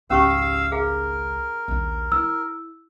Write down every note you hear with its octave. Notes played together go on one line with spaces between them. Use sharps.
G#1 C#2 C#4 G4 F5 C#6 E6
G#4 A#4 F5
A#1 D#2
E4 E6